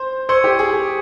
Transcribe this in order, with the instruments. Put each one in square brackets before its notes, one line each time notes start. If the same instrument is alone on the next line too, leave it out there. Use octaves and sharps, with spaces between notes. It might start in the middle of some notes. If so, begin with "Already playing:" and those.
Already playing: [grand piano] C5
[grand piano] C5 [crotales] C#6 E6 G#6 C#7 G7
[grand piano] G4
G#4
G#4